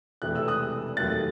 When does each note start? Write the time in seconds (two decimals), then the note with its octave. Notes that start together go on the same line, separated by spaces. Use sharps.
0.22 E1 E2 C3 E3 A3 F#6
0.35 E6
0.48 D#6 F#6
0.97 D#2 D#3 F#3 A3 F#6 A6